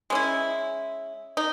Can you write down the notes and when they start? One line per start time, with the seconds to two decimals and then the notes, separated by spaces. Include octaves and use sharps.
0.10 G#3 C#4 E4
1.37 D#4